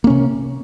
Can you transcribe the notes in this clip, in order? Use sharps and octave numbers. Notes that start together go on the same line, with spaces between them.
C3 A#3 C#4